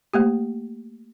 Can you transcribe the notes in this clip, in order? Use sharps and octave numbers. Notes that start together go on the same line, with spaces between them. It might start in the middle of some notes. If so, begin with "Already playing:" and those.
A3 A#3 G4